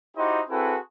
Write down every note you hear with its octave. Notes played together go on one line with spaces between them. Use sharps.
D#4 E4 F#4 G4 C5 D#5
C4 E4 F#4 G#4 A4 B4